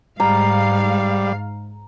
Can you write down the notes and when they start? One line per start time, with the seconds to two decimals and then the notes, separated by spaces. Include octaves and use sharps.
0.20 G#2 G3 F5 A#5